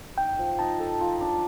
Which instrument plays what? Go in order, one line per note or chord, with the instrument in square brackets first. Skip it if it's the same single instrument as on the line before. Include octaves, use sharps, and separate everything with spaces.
[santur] D#4 [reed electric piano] G5
[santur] F3
[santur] D#4 [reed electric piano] A5
[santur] A4
F4
D4